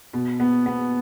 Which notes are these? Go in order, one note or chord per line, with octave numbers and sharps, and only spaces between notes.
B2
B3
B3